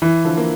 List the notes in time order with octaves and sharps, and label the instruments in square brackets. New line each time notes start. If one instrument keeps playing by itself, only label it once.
[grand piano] E3
[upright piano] D3 F3
A#3